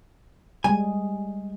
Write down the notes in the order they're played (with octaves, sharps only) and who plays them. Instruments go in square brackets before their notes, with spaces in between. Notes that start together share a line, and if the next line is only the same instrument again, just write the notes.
[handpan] G3 G#3 [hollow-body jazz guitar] G#5